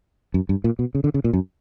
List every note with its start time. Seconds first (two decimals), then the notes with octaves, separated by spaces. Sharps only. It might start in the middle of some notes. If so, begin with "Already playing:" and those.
0.34 F#2
0.49 G2
0.64 A#2
0.79 B2
0.95 C#3
1.04 D3
1.14 C#3
1.24 A#2
1.33 F#2